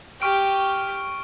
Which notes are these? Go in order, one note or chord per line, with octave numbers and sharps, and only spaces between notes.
G4 C#6 F6 D7